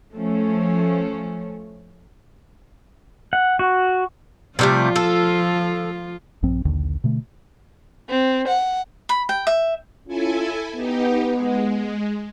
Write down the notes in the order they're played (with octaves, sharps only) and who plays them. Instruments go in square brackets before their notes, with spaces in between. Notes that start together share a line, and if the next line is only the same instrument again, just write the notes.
[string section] F3 A3 C#4
[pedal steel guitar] F#5
F#4
[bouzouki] C3 G3 A3 [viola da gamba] F3 F4
[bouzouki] A4
[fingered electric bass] A#1 G2 F3 C4
A#1 D#2 D3 D#3
B2 D3 A3
[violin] C4
F#5
[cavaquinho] B5
G5
E5
[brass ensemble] C#4 F4 [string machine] E4 A4 G#5
[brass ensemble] B3 [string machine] D#4 G4
[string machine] G#3